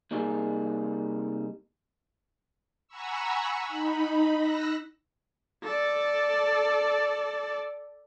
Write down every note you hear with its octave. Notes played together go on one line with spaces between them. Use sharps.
C2 G3 A#3 D#4 G#4 A4
F#5 G#5 A#5 B5 C#6 E6
D#4 B5
E6 F#6 A#6
A4 D5